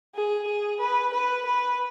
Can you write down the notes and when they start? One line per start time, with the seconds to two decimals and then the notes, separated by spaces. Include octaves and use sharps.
0.15 G#4
0.48 G#4
0.80 B4
1.14 B4
1.45 B4